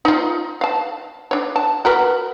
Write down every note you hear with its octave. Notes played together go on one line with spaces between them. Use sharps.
D#4 F4
F5 A5
D4 C#5
A5
F#4 A#4 B4